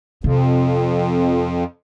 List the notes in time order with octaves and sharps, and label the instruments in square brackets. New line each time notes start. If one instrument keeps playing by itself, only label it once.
[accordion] F2 [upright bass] C3